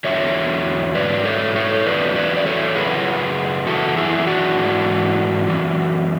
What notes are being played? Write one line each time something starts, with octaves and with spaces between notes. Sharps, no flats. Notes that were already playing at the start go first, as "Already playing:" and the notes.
E2 D3 F#3 C#5 E5
G#2 F#3 B4 D5
A4 C#5
A4 C#5
E2 D3 F#3 B4 D5
B4 D5
D5
A4 C#5
F#2 C#3 F#3 G#4 B4
F#2 E3 F#4 A4
E4 G#4
D4 F#4
G#2 E3
F#2 E3